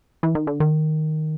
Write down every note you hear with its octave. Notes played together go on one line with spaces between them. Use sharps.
E3
D#3
D3
D#3